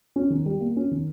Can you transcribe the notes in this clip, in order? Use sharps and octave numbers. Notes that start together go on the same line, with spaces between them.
C#4
D#3
G3
A#3
C#4
D#3